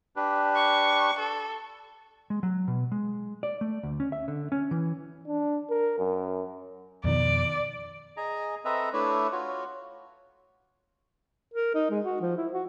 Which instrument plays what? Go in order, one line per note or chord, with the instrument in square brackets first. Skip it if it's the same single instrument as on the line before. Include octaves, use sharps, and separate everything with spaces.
[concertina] D4 G4 B4
[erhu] C#6
A4
[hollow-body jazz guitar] G#3
F#3
B2
G#3
D5
A3
D2
C#4
E5
D3
C#4
E3
[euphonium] D4
A#4
F#2
[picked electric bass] F2 B2 D#3 [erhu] D5
[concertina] G#4 D#5 G#5 A#5
C4 A4 B4 D#5 E5 A#5
A3 D4 E4 B4 C#5
F4 F#4 C#5
[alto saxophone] A#4
D#4
G#3
F#4
F3
E4
F#4